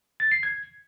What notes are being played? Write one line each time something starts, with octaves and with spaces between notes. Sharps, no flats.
A6
C7
G#6